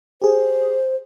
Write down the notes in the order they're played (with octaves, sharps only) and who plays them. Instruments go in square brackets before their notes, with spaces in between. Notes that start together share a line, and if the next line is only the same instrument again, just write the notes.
[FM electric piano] G4 G#4 [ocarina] C5